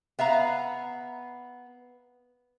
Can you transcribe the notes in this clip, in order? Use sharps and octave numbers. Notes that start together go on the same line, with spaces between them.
B3 E5 F5 A#5